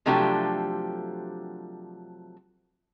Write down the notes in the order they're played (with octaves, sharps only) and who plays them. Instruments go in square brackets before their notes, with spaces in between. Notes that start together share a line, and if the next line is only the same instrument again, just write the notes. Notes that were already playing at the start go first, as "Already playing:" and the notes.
[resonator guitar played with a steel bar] C3 F3 F#3 A3 D4 G4